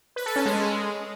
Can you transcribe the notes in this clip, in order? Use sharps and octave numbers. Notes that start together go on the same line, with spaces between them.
B4
A4
C#4
G#3